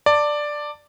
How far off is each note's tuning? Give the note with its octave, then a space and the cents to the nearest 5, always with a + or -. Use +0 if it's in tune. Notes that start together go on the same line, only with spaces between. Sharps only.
D5 +5 A5 +30